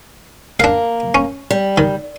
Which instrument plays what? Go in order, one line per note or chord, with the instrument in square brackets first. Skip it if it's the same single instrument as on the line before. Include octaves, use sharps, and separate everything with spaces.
[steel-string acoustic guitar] A#3 [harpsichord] D4 F5
[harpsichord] C#4
[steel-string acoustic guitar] G3
[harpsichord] D#3